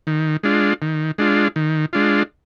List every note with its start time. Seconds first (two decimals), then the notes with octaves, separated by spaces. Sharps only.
0.07 D#3
0.43 G#3 D4 F4
0.82 D#3
1.18 G#3 D4 F4
1.56 D#3
1.93 G#3 D4 F4